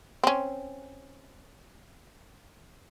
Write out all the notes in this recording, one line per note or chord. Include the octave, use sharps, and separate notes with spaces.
C4 C#4